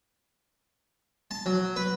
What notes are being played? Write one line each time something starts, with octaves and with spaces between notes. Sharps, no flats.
A5
F#3
B4